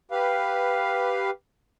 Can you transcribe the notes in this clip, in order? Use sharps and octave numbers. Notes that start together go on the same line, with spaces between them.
G4 B4 F5